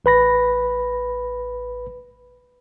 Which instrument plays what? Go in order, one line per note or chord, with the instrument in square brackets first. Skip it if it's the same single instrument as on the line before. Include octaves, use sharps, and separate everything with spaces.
[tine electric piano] A1 B4 B5 A#6